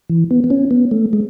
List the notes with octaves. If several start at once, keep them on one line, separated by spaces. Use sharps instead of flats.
E3
B3
B3
C#4
B3
A3
G#3